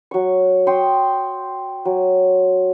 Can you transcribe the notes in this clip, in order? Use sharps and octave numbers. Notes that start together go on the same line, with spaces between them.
F#3 C#6
G5 C6 C#6 D#6
F#3